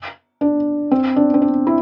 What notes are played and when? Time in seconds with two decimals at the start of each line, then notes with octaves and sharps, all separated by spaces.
0.41 D4
0.91 C4
1.16 D4
1.34 C4
1.42 D4
1.67 E4